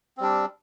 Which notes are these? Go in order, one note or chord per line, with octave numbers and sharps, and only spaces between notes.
G3 C4 D4